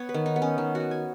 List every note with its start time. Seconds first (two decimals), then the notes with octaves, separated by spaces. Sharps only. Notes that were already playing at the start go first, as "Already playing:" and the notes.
Already playing: B3 C#5
0.09 B4
0.14 D#3
0.26 D#4
0.36 B3
0.42 C#4
0.58 D#3
0.75 F#4
0.80 B3
0.91 G#5